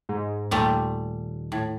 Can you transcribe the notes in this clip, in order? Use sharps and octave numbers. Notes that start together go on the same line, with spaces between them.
G#2
D#2 A#2 G3 A3
A2